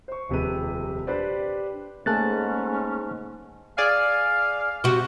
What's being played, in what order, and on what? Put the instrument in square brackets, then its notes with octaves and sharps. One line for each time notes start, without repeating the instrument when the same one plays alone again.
[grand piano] C5 C#6
D#1 F2 C3 G#3 B4 D#7
D4 G4 B4 C5 D5
[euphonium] G#2 [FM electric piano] A3 A#3 G#4 [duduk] C#4 [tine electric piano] A5 F#6 A6
[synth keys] G#4 D5 G#5 [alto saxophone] F5
[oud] C3 F#4